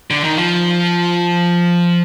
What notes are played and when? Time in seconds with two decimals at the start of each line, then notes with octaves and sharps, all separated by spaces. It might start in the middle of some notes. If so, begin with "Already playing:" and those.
0.10 D3
0.24 D#3
0.36 F3